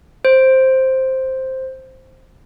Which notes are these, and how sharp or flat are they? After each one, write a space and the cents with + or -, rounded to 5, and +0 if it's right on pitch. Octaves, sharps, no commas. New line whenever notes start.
C5 +5